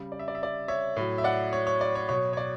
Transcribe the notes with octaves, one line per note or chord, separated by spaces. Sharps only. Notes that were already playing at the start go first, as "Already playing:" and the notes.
Already playing: C#3 G3
D5
E5
D5
E5
D5
C#5 E5
A2 F#3
E5
D5 F#5
C#5
C#5
D5
C#5
B2 F#3 C#5
C#5
D5